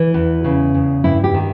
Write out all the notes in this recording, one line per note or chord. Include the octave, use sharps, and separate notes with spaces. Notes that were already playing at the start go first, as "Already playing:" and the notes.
Already playing: E3
E2
C#3
E2
G2 E4
G4
D#3